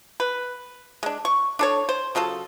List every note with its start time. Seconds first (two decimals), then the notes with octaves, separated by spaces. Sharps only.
0.20 B4
1.03 G#3 D4
1.25 C#6
1.59 D4 A4 C#5
1.89 C5
2.15 C#3 F#3 F4 A4